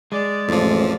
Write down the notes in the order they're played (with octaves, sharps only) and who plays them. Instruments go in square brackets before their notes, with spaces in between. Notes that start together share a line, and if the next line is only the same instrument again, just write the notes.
[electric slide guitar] G#3 [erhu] D5
[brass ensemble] A1 [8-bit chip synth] F2 F3